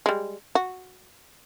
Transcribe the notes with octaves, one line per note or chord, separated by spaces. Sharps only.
G3 G#3
F#4